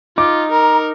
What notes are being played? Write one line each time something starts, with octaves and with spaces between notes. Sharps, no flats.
D#4 F4 D6
A#4 A#5